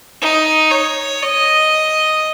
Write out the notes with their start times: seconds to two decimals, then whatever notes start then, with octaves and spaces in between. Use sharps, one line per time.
0.22 D#4
0.71 C#5
1.22 D#5